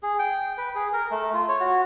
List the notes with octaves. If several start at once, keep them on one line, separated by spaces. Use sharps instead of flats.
G#4
G5
B4
G#4
A#4
A3
F4
C#5
F#4